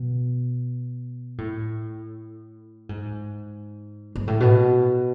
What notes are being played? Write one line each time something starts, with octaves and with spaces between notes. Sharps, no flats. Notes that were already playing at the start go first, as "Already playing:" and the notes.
Already playing: B2
A2
G#2
G#2
A2
B2